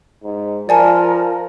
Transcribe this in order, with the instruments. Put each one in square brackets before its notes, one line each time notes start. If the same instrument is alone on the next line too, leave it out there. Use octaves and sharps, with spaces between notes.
[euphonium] G#2
[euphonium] F3 [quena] A#4 [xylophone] D5 G#5 A5